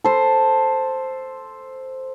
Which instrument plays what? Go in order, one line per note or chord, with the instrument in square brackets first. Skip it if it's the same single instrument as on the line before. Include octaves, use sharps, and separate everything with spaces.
[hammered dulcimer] A4 C5